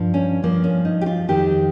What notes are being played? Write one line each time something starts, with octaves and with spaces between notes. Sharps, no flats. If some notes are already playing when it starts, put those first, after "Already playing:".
Already playing: G2 F3
C#4
G2 F3 A#3
C#4
D#4
G4
F4
F2 D#3 G4